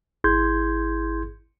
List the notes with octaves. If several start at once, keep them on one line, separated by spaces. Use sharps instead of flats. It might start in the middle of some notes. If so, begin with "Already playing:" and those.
G#1 E4 G#4 C6 G6 G#6